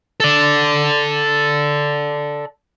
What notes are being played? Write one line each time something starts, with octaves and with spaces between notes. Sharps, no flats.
A4 D5